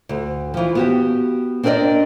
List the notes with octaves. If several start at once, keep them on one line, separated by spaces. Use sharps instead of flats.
D2
E3 F3
B3 F#4 G4
C4 D4 A#4 B4 D5 D#5